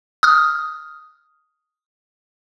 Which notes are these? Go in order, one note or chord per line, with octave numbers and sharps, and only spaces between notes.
D#6 F6